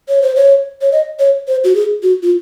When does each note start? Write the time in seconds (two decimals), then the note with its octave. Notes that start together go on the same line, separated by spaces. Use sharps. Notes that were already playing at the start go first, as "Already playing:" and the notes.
0.09 C#5
0.22 C5
0.36 C#5
0.81 C#5
0.92 D#5
1.19 C#5
1.48 C5
1.64 F#4
1.75 G#4
2.03 F#4
2.23 F4